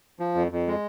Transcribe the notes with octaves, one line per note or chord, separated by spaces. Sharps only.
F3
F2
F2
G#3